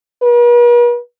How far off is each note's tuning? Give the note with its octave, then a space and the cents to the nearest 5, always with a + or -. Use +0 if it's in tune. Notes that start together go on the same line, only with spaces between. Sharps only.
B4 -45